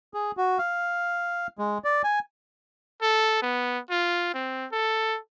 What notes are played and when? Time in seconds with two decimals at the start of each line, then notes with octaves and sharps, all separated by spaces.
0.14 G#4
0.37 F#4
0.59 F5
1.59 G#3
1.84 D5
2.04 G#5
3.02 A4
3.42 B3
3.90 F4
4.34 C4
4.72 A4